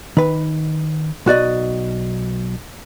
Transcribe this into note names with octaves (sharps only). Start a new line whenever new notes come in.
D#3 B4
B1 F#4 D5 D#5